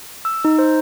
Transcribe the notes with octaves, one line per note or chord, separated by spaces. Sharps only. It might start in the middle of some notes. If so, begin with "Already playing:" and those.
E6
D#4
C5